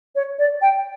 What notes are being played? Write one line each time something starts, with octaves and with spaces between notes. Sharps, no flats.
C#5
D5
G5